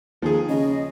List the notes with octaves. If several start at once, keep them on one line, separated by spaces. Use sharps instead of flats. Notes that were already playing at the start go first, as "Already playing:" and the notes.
D#2 F3 G#4
C#3 D#5